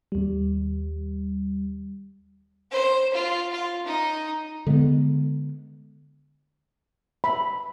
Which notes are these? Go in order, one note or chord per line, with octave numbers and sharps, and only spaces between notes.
D#2 G3
C5
F4
F4
D#4
D3 G#3 A#3 B3
B5